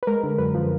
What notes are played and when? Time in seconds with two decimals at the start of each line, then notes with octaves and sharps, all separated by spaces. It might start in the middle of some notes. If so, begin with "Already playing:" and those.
0.03 B4
0.07 G#3 A#4
0.23 D3
0.38 F#2 B4
0.55 F3